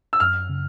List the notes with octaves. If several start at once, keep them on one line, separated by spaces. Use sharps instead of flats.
E6
F#2 F6
C#3